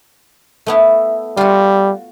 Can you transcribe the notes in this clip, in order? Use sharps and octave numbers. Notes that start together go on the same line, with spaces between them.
A3 B3 E4
G3 F4 F#4